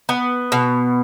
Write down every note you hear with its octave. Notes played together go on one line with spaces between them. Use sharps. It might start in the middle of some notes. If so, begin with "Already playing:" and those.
B3
B2